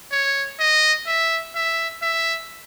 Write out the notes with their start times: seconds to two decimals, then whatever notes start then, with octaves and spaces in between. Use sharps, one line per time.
0.12 C#5
0.60 D#5
1.07 E5
1.55 E5
2.02 E5